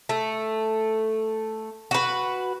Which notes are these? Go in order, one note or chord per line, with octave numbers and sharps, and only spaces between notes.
A3
F#4 B4